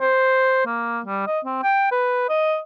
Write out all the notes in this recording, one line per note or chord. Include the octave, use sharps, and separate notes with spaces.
C5
A#3
G3
D#5
C4
G5
B4
D#5